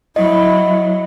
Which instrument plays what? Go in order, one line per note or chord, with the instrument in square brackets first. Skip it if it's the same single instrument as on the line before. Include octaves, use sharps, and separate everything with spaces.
[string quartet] F#3 [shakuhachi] E4 [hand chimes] D#5